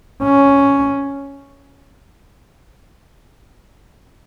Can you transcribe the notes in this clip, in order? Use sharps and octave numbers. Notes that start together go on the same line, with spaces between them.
C#4